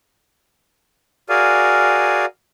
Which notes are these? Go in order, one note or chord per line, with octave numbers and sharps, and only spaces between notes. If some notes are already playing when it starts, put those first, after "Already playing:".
F#4 G#4 A#4 D5 F5 G#5